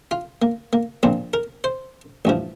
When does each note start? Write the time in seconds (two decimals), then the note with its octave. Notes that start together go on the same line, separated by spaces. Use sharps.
0.11 F4
0.42 A#3
0.73 A#3
1.03 A#1 A#2 F3 C4
1.34 A#4
1.64 C5
2.25 A1 G2 F3